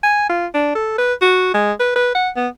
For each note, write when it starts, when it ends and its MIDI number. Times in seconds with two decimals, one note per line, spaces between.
0.03 0.28 80
0.29 0.46 65
0.54 0.74 62
0.75 0.93 69
0.98 1.13 71
1.21 1.50 66
1.54 1.72 56
1.80 1.94 71
1.95 2.13 71
2.15 2.29 78
2.36 2.48 59